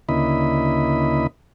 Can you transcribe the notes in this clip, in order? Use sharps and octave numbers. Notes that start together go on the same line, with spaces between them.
D2 C#3 A#3 E4 D#5 B5